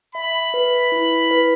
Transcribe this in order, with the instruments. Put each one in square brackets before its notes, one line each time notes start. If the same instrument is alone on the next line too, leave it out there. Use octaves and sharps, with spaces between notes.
[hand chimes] E5 [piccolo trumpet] B5
[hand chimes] B4
E4
B4